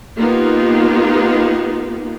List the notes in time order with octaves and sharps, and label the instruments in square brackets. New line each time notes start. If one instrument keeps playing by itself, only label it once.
[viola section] A#3 B3 D#4 F4 G4